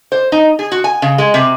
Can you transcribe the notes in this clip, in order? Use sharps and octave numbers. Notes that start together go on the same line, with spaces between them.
C5
D#4
G#4
F#4
G#5
C#3
G#3
C3